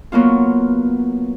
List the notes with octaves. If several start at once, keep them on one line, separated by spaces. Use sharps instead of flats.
F#3 A#3 B3 F4